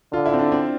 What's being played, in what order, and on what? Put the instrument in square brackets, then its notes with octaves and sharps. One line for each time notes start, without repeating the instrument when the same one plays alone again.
[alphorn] D3 [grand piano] F4
[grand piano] E4
C4
D4
C4